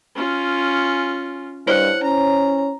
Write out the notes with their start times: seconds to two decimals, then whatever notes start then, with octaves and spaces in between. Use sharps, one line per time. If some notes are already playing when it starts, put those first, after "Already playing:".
0.15 C#4 F4
1.67 G2 E4 C5 C#5 F#5
2.03 C#4 A#5